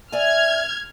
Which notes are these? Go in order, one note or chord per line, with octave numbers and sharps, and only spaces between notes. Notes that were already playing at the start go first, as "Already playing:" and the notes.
D5 E5 G#5 F6 G#6